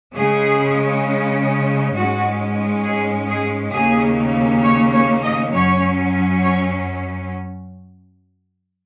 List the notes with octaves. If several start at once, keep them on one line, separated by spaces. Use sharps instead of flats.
C#3 G#3 C#4 G#4
G#2 G#3 C#4 F#4
G#4
G#4
D#2 C#3 A#3 C#4 G#4
C#5
C#5
D#5
F#2 F#3 C#4 C#5
C#5